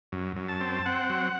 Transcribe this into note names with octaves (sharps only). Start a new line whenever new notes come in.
F#2
F#2
A5
C4
C4 F#5
F#3